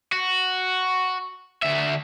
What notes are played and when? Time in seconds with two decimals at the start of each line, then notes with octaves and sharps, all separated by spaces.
0.12 F#4
1.62 D2 E5